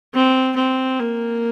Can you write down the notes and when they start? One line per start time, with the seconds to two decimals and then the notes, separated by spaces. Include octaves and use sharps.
0.14 C4
0.56 C4
1.00 A#3